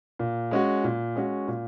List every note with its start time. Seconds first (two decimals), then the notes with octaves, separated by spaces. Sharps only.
0.19 A#2
0.51 G#3 C#4 F#4
0.84 A#2
1.16 G#3 C#4 F#4
1.48 A#2